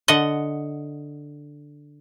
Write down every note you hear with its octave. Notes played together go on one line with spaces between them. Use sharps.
D3 D#5 F#5